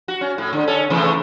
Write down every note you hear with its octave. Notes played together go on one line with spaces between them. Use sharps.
F#4
C#4
A2
D3
C#4 A4
C3 E3 A3